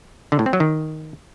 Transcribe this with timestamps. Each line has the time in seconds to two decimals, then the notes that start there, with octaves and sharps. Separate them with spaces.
0.32 D3
0.39 A2
0.46 C4
0.53 F#3
0.60 D#3